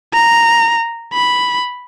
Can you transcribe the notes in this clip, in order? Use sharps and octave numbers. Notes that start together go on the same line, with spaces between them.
A#5
B5